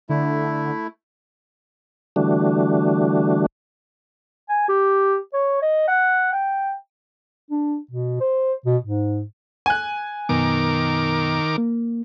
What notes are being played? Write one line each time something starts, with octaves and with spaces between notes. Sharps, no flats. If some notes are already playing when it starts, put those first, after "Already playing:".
D3 A3 E4
D3 E3 G3 A3 D4 F#4
G#5
G4
C#5
D#5
F#5
G5
D4
B2
C5
B2
G#2
G#5 F#6
F#2 B2 D#3 B3 A#4 D6
A#3